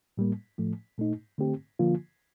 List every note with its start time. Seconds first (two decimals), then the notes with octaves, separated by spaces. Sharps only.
0.17 A2 G3 A#3
0.58 A2 F3 A3
0.98 A#2 A3 D#4
1.38 D3 A3 C4 G4
1.79 D3 F3 A#3 F4